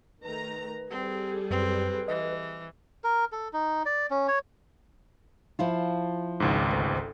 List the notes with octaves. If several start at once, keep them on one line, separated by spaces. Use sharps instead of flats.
D#3 A3 B4 A#5
G3 C4 G#4 A4
F#2 C4 B4
E3 D#5
A#4
A4
D#4
D5
C#4
C#5
F3 E4 F4
G#1 C#2 G#2
D2